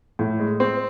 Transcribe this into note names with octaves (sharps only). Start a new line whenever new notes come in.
A2
G#3
C4